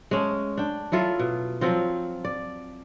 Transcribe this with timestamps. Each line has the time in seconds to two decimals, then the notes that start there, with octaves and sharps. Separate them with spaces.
0.11 G#3 A3 C#4
0.57 D4 G5
0.92 F#3 E4 F4 A4
1.19 B2
1.61 F3 F#3 C4 F4
2.25 D5